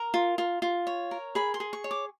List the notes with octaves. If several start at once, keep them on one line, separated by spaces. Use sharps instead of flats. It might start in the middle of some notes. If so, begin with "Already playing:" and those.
Already playing: A#4 A#5
F4
F4
F4
C#5
A#4
G#4 B5
C6
G#4
C#6
C#5
D6